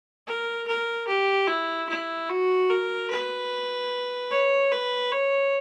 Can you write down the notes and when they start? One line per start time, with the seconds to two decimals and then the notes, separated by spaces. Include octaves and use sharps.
0.27 A#4
0.67 A#4
1.07 G4
1.47 E4
1.89 E4
2.29 F#4
2.69 A#4
3.10 B4
4.31 C#5
4.72 B4
5.12 C#5